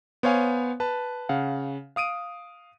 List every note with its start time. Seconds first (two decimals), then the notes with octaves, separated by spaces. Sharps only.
0.23 B3 C5 C#5 F5 G#5
0.80 B4 A5
1.29 C#3 F5 F#5
1.96 F5 D#6 D7 D#7